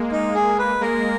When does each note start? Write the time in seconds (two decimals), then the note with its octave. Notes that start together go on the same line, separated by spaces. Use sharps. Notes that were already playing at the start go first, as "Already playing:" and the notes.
Already playing: G#3 A#3
0.12 D#4
0.35 G#4
0.59 B4
0.81 G#3 A#3 A#4